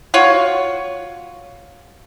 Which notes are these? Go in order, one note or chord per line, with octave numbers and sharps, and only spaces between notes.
F4 F#4 C#5